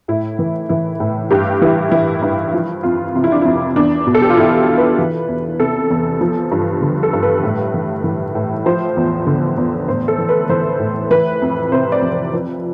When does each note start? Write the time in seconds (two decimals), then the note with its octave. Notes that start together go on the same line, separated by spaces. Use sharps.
0.08 A2 E4
0.39 E3
0.69 E3 E4
1.00 A2
1.31 G2 G4
1.62 E3 E4
1.92 E3 E4
2.22 G2
2.53 F3 E4
2.83 F2 F4
3.15 C3 F4
3.24 E4
3.32 D4
3.42 F2 E4
3.76 E2 D4
4.07 B2
4.15 A4
4.22 G4
4.30 F4
4.37 B2 E4
4.68 E2
4.78 B4
4.99 E3
5.28 E2
5.59 C3 A4
5.90 E2
6.21 F3
6.51 G2
6.82 D3
7.03 A4
7.13 G2
7.23 B4
7.43 A2
7.74 E3
8.04 E3
8.35 A2
8.66 F3 C5
8.97 E2
9.27 D3
9.57 E2
9.88 A2 C5
10.08 A4
10.18 E3
10.29 B4
10.49 E3 C5
10.80 A2
11.11 E3 B4
11.42 F2
11.72 C3 C5
11.92 D5
12.02 F2
12.12 C5
12.33 F3 B4